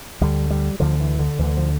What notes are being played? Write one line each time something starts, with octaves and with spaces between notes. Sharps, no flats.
D2 D3 G3
G3
D2 D3 F3
E3
D3
D2 D3 E3
F3